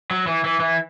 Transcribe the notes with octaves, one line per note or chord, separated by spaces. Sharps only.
F#3
E3
E3
E3